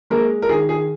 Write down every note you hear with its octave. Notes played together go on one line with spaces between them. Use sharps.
G#3 A#3 A#4
A#4
D#3 G#4
G#4